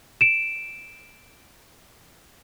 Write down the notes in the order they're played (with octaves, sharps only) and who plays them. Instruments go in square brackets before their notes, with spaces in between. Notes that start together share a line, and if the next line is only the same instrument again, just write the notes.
[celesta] D7 E7